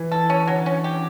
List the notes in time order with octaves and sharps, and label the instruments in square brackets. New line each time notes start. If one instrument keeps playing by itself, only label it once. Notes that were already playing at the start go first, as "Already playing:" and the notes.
Already playing: [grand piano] E3
[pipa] A4
C#4
[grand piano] D3 [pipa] F#3
[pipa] C#4
G4